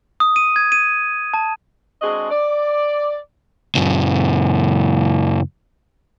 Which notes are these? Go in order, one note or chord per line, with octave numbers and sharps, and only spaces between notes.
D#6
D#7
G#6
D#7
A5
G#3 C4 D4 F#4 G#4 D#5
D5
C#2 F#2